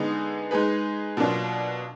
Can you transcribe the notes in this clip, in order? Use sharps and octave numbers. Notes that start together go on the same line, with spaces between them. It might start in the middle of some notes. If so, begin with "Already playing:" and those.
Already playing: D3 G#3 B3 D#4 G#4
G#3 D#4 G#4 B4
B2 F#3 A#3 D4 F4